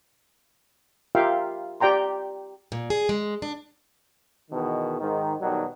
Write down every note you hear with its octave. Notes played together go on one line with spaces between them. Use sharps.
F4 G4 A#4 E5 F5 G5
G4 D5 G5 A#5 C6
A#2
G#4
G#3
D4
E2 B2 D#3
G#2 D#3
B1 B2 D#3 F#3 G3